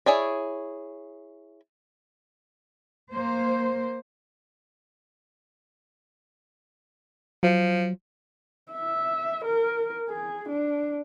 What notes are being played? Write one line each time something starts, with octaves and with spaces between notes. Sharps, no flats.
E4 G#4 C#5 D5
A#3 C5
F3 F#3
E5
A#4
G#4
D4